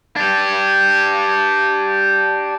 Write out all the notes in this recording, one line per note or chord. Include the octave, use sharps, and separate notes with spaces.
D4 G4